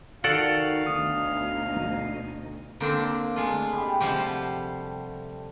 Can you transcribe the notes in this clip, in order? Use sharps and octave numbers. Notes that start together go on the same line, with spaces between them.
D#3 F#4 A4 D5 F5 F#5
D2 B2 D#4 D#6
D3 A#3 C4 D4
G#3 A3 F4
G4 F5 B5
C3 F3 G3 F#5